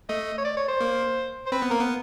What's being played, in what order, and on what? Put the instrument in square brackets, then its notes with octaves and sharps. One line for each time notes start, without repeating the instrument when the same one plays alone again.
[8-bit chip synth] A3 [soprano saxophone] D#5
[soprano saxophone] C#5
D5
C#5
C5
[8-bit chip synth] A#3
[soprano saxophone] C5
[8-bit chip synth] C4 [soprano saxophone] B4
[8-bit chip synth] B3
[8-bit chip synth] A#3 [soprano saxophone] A#4
[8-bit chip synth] B3